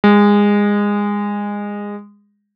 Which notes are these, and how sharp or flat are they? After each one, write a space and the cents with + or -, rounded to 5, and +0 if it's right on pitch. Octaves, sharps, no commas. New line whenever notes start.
G#3 -20